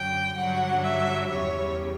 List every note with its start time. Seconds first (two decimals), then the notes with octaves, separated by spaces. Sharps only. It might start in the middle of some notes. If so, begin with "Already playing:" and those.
Already playing: F#2 D3 F#3 G5
0.36 G2 D3 F#3 F#5
0.83 E5
1.30 E2 C#3 G3 C#5